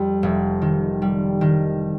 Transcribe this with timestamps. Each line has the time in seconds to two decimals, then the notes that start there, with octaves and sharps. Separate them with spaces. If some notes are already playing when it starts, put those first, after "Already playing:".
Already playing: F2 G3 G5
0.23 F1
0.62 D#3
1.02 G3
1.41 D#3